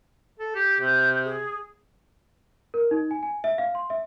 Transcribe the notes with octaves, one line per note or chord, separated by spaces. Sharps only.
A4
G4 G6
C3 G6
G#4
A#4
D#4
G#5
G#5
E5
F5
C6
E5